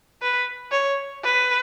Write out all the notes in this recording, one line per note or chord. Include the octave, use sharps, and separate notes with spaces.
B4
C#5
B4